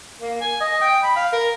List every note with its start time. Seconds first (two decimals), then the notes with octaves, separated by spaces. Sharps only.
0.21 A#3
0.41 G#5
0.60 D#5
0.81 G5
1.03 B5
1.16 F5
1.32 A#4